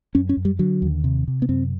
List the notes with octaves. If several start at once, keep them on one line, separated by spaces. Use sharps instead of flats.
F#2 C#4
C#4
F#2
G3
D3 F#3
D#2
C3
C3
B3
F#2 C4